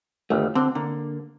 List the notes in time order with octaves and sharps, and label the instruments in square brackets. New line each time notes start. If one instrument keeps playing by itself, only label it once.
[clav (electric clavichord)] G1 D#2 [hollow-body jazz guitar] A3
[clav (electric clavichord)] D3 [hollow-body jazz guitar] C4
[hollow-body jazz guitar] D3 [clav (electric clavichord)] A#3